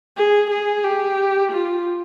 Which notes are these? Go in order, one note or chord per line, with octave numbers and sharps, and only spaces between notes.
G#4
G#4
G4
F4